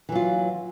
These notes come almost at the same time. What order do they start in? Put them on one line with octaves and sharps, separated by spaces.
E3 F#3 F4